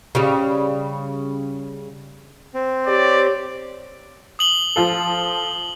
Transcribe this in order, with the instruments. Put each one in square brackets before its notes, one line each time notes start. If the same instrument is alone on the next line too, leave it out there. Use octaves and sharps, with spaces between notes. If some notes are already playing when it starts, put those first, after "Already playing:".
[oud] C#3 G3
[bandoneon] C4
[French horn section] G4 C#5 [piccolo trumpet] D5
[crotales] D#6 F#7 G7
[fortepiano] F3 F4 A4